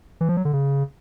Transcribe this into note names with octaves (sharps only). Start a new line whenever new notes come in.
E3
F3
F#3
D3
C#3